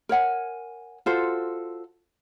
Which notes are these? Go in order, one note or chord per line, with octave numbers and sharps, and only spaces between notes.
A#4 C#5 F#5 G#5
F4 F#4 A4 C5